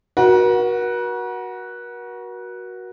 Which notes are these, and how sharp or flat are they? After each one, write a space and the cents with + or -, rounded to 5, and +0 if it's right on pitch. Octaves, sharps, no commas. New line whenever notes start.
F#4 +0 A#4 +45